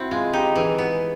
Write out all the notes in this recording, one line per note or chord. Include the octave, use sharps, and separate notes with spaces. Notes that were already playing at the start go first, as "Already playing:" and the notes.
Already playing: C4 E4 F#4
G#3 F4
D#4 G4
E3 G#4
B3